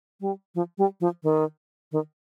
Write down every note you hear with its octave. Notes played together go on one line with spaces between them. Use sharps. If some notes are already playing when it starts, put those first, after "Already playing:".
G3
F3
G3
F3
D#3
D#3